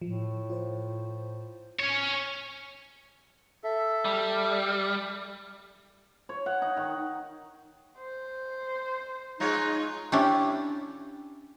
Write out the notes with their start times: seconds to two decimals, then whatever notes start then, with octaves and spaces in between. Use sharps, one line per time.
0.02 A2 F3
0.50 F4 C5
1.79 C#4 C#5
3.64 A4 E5
4.05 G3
6.29 C#5
6.46 F#5
6.62 D#4
6.77 D#3
7.98 C5
9.40 G#3 D#4 F4 C#5
10.12 C#4 D4 E4 F4 G4